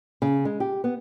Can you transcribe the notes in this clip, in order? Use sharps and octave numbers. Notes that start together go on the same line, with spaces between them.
C#3
G#3
G4
B3